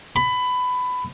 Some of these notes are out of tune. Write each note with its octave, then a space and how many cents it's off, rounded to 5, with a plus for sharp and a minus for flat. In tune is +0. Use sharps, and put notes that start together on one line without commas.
B5 +20